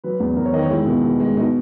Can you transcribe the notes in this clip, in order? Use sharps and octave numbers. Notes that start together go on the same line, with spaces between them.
F#3 B4
E2
E2 A#4
C#5
D#3 D#5
C#5
G#3 E4
B2
B2
G#3
B2 D#4